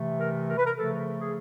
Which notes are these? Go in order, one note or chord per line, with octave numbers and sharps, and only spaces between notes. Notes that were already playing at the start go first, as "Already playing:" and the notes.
Already playing: C3 E3 A3
A#4
A#4
B4
A#4
C#3 F3 A3 A4
G#4